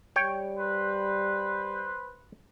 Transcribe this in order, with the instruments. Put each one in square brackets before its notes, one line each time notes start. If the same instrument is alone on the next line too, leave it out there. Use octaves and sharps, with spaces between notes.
[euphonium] G3 [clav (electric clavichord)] C#5 G5
[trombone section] B4 C5